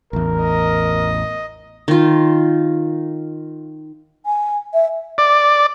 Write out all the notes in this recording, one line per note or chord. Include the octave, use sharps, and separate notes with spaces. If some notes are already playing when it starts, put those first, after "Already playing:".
A1 E2 A#4
D#5
D#3 F4
G#5
E5
D5